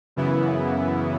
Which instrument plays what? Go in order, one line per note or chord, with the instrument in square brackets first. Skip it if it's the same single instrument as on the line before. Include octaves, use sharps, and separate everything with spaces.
[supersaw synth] F#2 C#3 E3 B3 E4